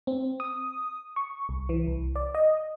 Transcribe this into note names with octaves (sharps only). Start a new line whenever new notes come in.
C4
D#6
C#6
C2
E3
C2
D5
D#5